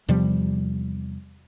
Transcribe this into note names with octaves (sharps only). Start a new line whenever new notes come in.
E2 C3 F3 G3